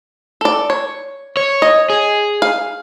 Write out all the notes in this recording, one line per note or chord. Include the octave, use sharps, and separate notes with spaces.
A4 D5
C#5
C#5
D#5
G#4
F5